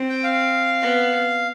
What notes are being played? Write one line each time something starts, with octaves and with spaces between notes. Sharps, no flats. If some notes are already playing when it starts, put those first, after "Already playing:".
Already playing: C4
G5
F5
B3